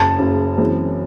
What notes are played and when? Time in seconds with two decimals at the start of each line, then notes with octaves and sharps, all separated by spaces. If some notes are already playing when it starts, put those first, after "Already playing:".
Already playing: F#1 F#2 C#3 A5
0.18 F#1 F#2 C#3
0.57 F#2 E3 G#3 C4